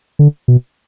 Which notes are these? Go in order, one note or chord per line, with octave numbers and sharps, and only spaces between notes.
D3
B2